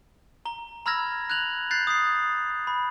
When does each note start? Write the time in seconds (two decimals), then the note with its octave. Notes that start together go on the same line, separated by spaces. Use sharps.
0.45 A#5 G7
0.86 A#5 B5 E6 F6 G#6 A#6
1.30 F#6 G#6 F7 F#7
1.71 F#6 G6 A6 C7
1.87 D#6 C7
2.67 B5